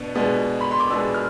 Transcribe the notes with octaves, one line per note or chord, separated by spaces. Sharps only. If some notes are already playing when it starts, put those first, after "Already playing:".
Already playing: B2 B3 D4
B2 G#3 B3 D4
B5
C6
D6
B2 G#3 B3 D4 E6
F6